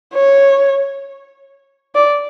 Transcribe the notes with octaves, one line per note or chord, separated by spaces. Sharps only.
C#5
D5